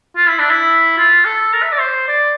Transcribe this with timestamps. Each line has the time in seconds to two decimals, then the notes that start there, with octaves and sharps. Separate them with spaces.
0.17 F4
0.28 E4
0.39 D4
0.50 E4
0.98 F4
1.25 A4
1.53 A#4
1.62 E5
1.72 D5
1.80 C5
2.08 D5